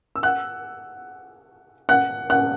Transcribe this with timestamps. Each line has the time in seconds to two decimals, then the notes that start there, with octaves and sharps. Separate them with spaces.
0.16 E6
0.23 F#5 F#6
1.89 F#5 F#6
2.30 F#5 F#6